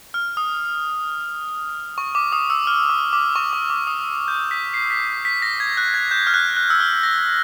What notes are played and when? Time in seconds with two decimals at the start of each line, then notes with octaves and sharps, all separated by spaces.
0.14 F6
0.37 D#6
1.98 C#6
2.15 D6
2.32 D#6
2.50 E6
2.67 F6
2.90 D6
3.13 D6
3.36 C#6
3.53 D6
3.70 D6
3.87 D#6
4.28 G6
4.51 B6
4.74 C7
4.90 B6
5.25 B6
5.42 A#6
5.60 G#6
5.77 F#6
5.94 G#6
6.11 G6
6.27 F6
6.34 F#6
6.57 F#6
6.70 E6
6.80 F6
7.03 A#6